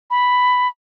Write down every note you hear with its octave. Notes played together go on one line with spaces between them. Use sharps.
B5